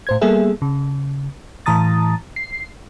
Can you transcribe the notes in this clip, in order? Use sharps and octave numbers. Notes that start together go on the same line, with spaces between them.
A2 C5 G#6
G3 A#3 B3 G#4 A4 E5
C#3
A2 E3 A5 A#5 D#6 A6
C7